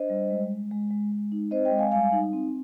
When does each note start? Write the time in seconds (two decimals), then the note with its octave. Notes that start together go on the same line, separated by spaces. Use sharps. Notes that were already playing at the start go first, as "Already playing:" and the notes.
Already playing: D4 C5 D#5
0.10 G3
0.30 G#3
0.51 G#3
0.71 G#3
0.91 G#3
1.12 G#3
1.32 D#4
1.51 C4 C5 D#5
1.65 D#5 G5
1.72 G#3
1.78 F5 G#5
1.92 G3 F5 G#5
2.13 D#4
2.33 C4